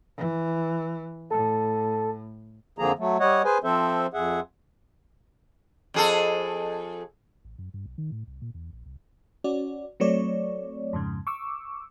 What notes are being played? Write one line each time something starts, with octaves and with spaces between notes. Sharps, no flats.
E3
A2 A4
F2 D3 F3 A#3 G#4 A#5
F#3 A3
G3 C#5 D#5 F#5
G#4 B4 C5 G#5
F3 C4 A4 C5 E5
F2 G#4 E5 F#5
F2 G#4 A4
A1
F#2
G2
B1
D#3
A2
C2
A#2
E2
A#1
C2
C#4 F#4 D5
F#3 A3 C4 C#5 D5
F2 G#2 C#3
C#6 D6 E6